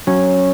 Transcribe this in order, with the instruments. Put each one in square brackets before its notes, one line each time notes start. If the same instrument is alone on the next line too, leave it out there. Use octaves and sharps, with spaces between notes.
[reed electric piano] F#3 [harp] C#4